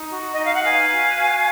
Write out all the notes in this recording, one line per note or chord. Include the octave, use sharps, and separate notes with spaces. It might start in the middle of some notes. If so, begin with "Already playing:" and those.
Already playing: D#4
F#4
D#4 D#5
F5
F#5
B4 F5 G#5
F#4
F#4